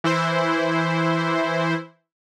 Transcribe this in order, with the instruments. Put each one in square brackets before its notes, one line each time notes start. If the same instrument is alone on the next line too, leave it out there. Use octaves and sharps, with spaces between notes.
[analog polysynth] E3 E4 C5